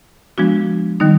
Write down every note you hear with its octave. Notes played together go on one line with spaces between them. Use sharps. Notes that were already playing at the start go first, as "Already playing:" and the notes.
F3 G#3 B3 D4 F#4
D#3 G3 B3 D#4